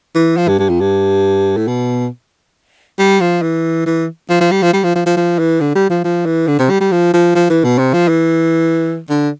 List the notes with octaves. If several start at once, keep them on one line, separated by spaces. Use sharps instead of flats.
E3
F3
G2
G2
F2
G2
A2
B2
G3
F3
E3
E3
F3
F3
G3
F3
G3
F3
F3
F3
F3
E3
D3
G3
F3
F3
E3
D3
C3
G3
G3
F3
F3
F3
E3
B2
C3
F3
E3
D3